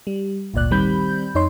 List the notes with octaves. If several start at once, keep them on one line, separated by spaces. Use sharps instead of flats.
G3
G#1 D2 A#2 D5 F#6
D#3 G3 C4 B5 G6
F2 D#4 C#5 C6